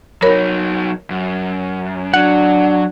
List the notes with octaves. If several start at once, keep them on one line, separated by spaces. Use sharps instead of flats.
F#3 D#4 A#4 C#5 B5
F#2
F#3 D4 F#5